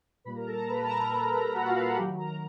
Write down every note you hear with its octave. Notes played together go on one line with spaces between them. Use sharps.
A#2 G3 A#3 B4 B5
A#4 A#5
A4 A5
A#4 A#5
B4 B5
A#4 A#5
A5
A#4 A#5
A4 A5
F#4 F#5
F4 F5
F#4 F#5
D#3 F#3 A3 G4 G5
A#4 A#5